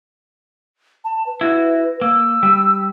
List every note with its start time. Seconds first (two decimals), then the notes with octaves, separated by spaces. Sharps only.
1.04 A5
1.26 B4
1.41 E4 F#4
2.01 A#3 E6
2.43 G3